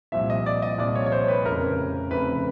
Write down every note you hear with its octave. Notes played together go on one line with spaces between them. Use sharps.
C2 A#2 F3 E5
D#5
D5
D#5
C2 A#2 F3 D5
C#5
C#5
C5
B4
F1 F2 C#3 A#4
F1 F2 C#3 B4